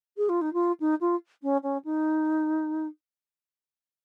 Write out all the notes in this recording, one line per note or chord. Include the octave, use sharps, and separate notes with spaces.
G#4
F4
D#4
F4
D#4
F4
C#4
C#4
D#4